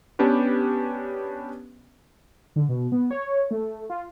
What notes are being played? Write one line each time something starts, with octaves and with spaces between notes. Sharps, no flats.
B3 C#4 D4 G4 B4
D3
B2
B3
C#5
A3
F4